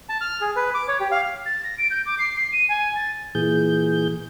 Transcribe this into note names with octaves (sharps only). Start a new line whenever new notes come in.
A5
F6
G#4
B4
D6
C#5
G4
F5
A6
A#6
D7
G6
D6
C7
C7
D#7
G#5
A6
A#2 E3 G#4 G6